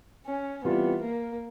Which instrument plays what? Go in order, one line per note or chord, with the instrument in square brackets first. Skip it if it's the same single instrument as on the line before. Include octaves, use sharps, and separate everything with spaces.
[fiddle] C#4
[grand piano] E3 G3 C4 F4 [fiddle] B3
[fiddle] A#3